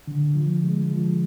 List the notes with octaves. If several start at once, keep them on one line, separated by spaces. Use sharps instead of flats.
D3
F3
G#3
F3